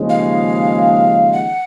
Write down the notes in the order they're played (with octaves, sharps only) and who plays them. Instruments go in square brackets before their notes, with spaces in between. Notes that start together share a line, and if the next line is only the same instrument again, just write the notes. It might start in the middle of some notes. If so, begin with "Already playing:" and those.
Already playing: [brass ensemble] D#2 C#3 F3 G#3
[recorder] F5
F#5